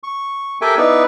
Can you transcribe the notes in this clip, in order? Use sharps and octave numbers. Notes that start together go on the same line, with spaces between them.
C#6
G4 A4 A#4 E5 G5 G#5
B3 D#4 E4 B4 D5